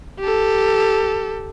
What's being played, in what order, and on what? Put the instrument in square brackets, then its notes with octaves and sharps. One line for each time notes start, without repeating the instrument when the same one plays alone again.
[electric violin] G4 A4